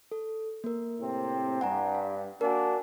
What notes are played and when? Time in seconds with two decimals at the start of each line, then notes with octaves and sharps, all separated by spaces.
0.11 A4
0.64 A#3 A#4
1.00 A2 C3 C4
1.61 G2 F#5 G#5 A#5
1.95 F5
2.41 A#3 D4 F#4 A#4 G#5